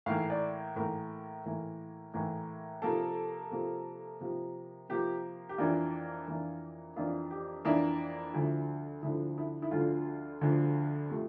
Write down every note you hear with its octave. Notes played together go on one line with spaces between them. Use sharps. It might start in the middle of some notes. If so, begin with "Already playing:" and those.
A2 E3 A#3 F5
D5
A2 E3 A#3 A#4
A2 E3 A#3
A2 E3 A#3
C3 F3 A#3 A4
C3 F3 A#3
C3 F3 A#3
C3 F3 A#3 G4
G4
F2 E3 A#3 D4 F4
F2 E3 A#3 D4
F2 E3 A#3 D4 F4
G4
F2 E3 A#3 D4 E4
D2 D3 F3
D2 D3 F3 E4
E4
E4
D2 D3 F3 F4
D2 D3 F3
C3 F3 A3